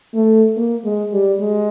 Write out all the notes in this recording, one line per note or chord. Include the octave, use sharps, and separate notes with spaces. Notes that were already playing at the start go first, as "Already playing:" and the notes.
A3
A#3
G#3
G3
G#3